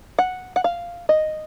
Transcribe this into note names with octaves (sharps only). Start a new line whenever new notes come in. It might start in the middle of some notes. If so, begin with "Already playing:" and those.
F#5
F#5
F5
D#5